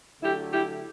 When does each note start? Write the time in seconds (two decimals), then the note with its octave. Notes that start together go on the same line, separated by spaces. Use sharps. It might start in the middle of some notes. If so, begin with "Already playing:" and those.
0.21 D3 F#3 A3 E4 G4
0.52 E4 G4